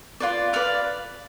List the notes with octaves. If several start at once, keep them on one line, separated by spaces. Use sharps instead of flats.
F4 B4 D5
B4 D5 F5